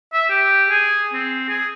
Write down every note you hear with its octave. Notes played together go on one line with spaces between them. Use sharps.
E5
G4
G#4
C4
G#4